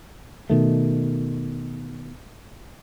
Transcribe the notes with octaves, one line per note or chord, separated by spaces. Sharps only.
B2 D#3 A3